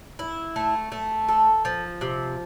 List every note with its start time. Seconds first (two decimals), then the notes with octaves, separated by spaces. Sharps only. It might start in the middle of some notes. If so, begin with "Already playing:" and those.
0.19 E4
0.56 A3
0.92 A3
1.28 A4
1.65 F3
2.01 C3